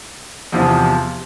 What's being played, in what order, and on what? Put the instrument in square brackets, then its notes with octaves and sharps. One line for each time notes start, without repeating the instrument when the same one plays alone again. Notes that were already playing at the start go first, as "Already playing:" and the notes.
[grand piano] E2 C3 F3